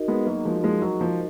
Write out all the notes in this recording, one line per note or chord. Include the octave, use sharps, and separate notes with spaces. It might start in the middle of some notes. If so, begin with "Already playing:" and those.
Already playing: D#4 F#4 A#4 D#5
G#3 B3
F#3 A#3
F3 G#3
F3 G#3
F#3
F3